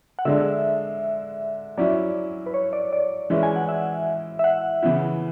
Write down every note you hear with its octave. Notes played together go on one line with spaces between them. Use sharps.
F#5
D3 G#3 D4 E5
F#3 C#4 E4 D5
B4
C#5
D5
D5
E3 G#3 C#4 E4
G#5
F#5
E5
E5
F#5
C#3 E3 B3 E4